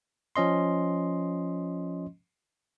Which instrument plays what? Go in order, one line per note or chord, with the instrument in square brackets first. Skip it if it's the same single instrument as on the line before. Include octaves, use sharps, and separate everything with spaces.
[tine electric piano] F3 C#4 D#5 C6